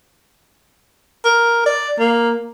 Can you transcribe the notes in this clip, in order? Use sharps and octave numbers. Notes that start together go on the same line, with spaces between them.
A#4
D5
A#3